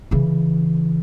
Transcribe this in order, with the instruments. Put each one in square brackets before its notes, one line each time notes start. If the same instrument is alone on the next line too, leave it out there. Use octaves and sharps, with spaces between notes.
[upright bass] C#3 E3